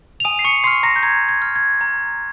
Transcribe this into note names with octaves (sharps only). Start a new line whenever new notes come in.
F7
G#5 D#6 D#7
C7
C#6 C#7
C6 F6 C7
A#5 A#6
G6
A#5 G#6
G#6
F6
G#6
A#5